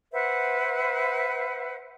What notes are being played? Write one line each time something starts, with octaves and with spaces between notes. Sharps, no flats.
B4 C5 E5 F#5